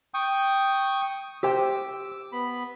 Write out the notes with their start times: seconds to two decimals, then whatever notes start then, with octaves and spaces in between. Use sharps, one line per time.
0.14 G5 C#6 D#6
1.43 G4 C5 G5 D6 E6
2.32 B3 B5